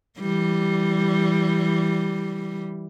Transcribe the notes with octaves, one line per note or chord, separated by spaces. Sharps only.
E3 G3